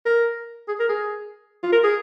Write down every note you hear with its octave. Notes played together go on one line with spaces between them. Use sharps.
A#4
G#4
A#4
G#4
F4
A#4
G#4